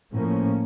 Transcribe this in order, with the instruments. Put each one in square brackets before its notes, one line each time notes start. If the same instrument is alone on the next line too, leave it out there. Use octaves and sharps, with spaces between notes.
[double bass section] A2 F3 A#3 C#4